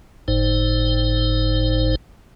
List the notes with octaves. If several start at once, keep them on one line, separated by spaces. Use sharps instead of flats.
G1 A2 D#4 C5